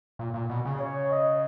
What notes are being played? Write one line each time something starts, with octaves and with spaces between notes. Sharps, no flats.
A#2
A#2
B2
C#3
C#5
D#5